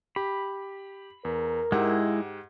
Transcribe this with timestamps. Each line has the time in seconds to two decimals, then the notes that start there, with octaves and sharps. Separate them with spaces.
0.16 G4 B5
1.25 E2 A#4
1.72 G#2 G#3 E4 G4 F#5